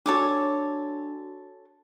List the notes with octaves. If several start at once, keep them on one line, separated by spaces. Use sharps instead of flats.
D4 F#4 A4 C#5 D6